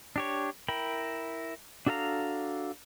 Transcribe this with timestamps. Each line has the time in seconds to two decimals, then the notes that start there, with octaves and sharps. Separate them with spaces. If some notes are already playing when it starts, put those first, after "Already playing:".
0.16 D4 G4 C#5
0.68 E4 A#4 G5 B5
1.87 D4 F#4 A4 F5 A#5